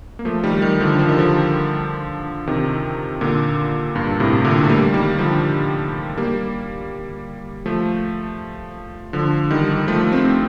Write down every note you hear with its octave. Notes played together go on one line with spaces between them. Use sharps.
A#3
F3 A3
D#3 G3
D#3 G3
D3 F3
F3
D#3
D3 F3
C3 D#3
A#2 D3
G2 A#2
A2 C3
A#2 D3
A3
G3 A#3
D#3 G3
D3 F3
G3 A#3
F3 A3
D3 F3
D#3 G3
F3 A3
A3 C4